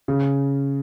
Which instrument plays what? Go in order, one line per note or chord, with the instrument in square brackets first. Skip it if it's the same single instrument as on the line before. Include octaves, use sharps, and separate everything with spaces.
[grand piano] C#3